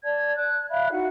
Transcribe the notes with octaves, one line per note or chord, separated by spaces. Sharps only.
D5 A5 G#6
F#6
E5 F5 B5 F#6
D#4 E4 F#4 F#5